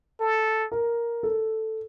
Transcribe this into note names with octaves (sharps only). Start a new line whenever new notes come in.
A4
A#4
A4